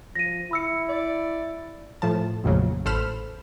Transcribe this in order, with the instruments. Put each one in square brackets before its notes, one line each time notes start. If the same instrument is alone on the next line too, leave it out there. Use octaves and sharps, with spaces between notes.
[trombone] F3 [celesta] A#6 D#7
[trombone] E4 [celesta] B5 E6 C#7
[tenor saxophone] D5
[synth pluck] A2 F3 A5
A1 F2 A#2 C#3 F#3
A1 A4 C5 B5 F6 E7